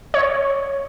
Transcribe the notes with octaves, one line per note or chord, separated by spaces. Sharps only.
C#5